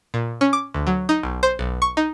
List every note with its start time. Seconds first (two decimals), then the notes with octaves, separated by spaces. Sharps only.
0.14 A#2
0.41 C#4
0.53 D6
0.74 D2
0.87 F#3
1.09 D#4
1.23 B1
1.43 C5
1.59 B1
1.82 C#6
1.97 D#4